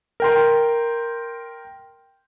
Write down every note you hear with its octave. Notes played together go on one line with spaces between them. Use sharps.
A#4 G5 C6